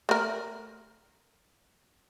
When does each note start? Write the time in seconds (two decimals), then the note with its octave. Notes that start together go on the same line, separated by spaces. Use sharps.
0.09 A3 A#4